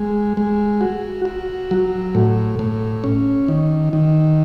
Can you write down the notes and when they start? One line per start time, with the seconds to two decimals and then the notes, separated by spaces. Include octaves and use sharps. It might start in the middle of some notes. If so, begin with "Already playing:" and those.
Already playing: G#3
0.37 G#3
0.81 F#4
1.25 F#4
1.71 F#3
2.15 A2
2.59 A2
3.04 C#4
3.48 D#3
3.93 D#3